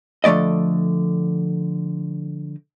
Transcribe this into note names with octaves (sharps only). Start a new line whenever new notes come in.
D3 F3 A3 D5 D#5